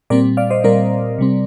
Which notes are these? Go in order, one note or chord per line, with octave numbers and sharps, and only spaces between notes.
A#2 G3 C4 A#4 D5
D5 F5
C5 D#5
A#2 G3 C4 A#4 D5
C3 G3 C4